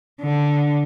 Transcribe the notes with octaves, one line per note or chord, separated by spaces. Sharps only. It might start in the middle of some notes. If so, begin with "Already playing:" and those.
D3